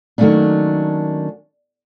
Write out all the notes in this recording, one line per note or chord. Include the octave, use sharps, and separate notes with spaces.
D#3 F#3 A3 A#3 C#4 D4